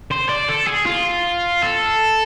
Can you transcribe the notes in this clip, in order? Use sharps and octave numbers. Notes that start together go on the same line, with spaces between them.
C5
D5
A4
G#4
F4
A4